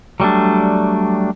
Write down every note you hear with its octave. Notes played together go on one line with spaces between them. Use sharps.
F#3 G3 A3 D4